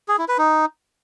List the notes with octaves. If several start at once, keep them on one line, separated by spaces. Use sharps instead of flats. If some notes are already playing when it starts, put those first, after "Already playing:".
G#4
E4
B4
D#4